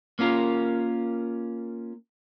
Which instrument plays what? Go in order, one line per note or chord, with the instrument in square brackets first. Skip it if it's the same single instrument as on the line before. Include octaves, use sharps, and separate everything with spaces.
[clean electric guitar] A#3 C#4 F4 A#4